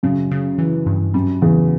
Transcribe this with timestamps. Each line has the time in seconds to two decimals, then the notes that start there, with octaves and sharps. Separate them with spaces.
0.03 F#2 C#3
0.31 C#3
0.58 E3
0.86 G2
1.14 F#2 G3
1.42 E2 C#3